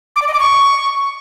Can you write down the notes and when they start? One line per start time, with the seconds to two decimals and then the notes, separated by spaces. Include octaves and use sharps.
0.16 D6
0.22 D5
0.28 D#5
0.33 D6
0.39 C#6